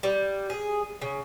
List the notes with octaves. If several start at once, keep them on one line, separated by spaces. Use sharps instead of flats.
G3
G#4
C#3